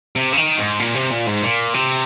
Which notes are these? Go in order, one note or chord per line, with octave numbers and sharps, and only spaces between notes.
C3
C#3
D#3
G#2
A#2
C3
A#2
G#2
A#2
C3